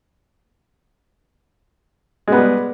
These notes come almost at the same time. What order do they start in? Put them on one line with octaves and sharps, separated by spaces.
G#3 B3 G3